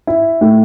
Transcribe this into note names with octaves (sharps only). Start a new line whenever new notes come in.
E4
A2